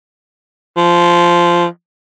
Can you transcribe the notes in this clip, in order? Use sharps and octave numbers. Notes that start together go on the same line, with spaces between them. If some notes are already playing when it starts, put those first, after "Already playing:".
F3